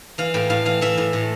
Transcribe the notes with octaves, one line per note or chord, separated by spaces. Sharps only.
E3 F5
A2 G5
A2 F5
E3 F5
E3 E5
A2
A2